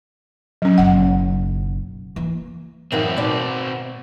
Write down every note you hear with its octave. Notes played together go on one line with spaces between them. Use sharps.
F#3 C#4
F#1 B1 F#5
E3 A#3
F#2 D#3 E3 C4 F#4
B2 D5